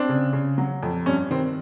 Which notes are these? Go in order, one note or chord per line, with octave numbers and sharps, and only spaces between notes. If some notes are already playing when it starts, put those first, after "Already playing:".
Already playing: C4 D4
C#3
C#3
F#3
F2
G2 C#4
D#3 C4